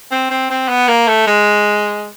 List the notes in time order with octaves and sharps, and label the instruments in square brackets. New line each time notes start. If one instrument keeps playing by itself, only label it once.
[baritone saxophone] C4
C4
C4
B3
A#3
A3
G#3